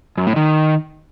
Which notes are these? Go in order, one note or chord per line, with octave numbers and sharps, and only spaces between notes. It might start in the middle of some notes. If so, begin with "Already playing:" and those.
F#2
A2
D#3